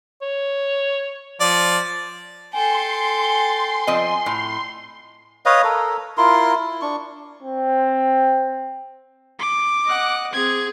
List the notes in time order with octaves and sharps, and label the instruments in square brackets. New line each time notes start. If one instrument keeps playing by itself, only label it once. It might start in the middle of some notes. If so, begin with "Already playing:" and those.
[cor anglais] C#5
[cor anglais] F3 [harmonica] D5
[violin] A4 G5 [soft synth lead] G#5 [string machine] C6
[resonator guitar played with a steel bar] F3 C4 D#5
A2
[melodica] B4 C#5 D#5 F5
A4 A#4
E4 F4 A#4 C6
E4
D4 C#6
[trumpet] C4
[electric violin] D6
[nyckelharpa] D#5 F#5
[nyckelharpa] C4 G#4 [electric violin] G#6